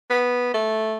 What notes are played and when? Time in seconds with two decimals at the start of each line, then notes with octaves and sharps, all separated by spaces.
0.10 B3
0.54 A3